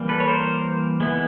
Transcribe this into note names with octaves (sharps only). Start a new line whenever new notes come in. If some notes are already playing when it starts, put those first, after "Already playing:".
Already playing: E3 G3 A#3
A4 B4
C#5
A#4 C5
G#3 B3 E4